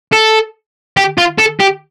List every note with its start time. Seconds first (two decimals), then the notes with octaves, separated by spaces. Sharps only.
0.13 A4
0.97 G4
1.18 F4
1.38 A4
1.60 G4